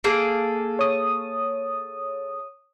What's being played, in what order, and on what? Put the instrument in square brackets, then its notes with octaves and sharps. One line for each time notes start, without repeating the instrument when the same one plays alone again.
[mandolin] A#3 G#4 A4
[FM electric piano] C#5 D#6